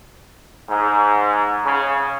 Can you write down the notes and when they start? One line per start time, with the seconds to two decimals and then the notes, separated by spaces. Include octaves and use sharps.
0.69 G#2
1.65 C#3